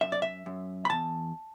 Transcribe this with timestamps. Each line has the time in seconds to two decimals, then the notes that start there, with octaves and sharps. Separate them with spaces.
0.01 F#2 E5
0.12 D5
0.22 E5
0.46 F#2
0.85 B5
0.90 E2 A5